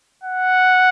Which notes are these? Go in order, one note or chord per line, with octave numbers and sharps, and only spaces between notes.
F#5